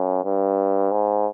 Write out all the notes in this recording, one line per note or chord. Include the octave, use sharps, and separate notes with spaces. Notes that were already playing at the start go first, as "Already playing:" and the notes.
Already playing: F#2
G2
G#2